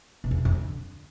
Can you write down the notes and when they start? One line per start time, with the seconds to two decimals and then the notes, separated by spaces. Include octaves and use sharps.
0.24 B2
0.31 E2
0.38 D#3
0.45 F2
0.52 D3